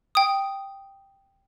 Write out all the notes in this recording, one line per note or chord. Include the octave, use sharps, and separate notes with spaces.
G5 D#6